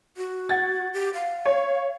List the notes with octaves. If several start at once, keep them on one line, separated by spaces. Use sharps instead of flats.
F#4
F#5 G#6 A6
G4
F5
C#5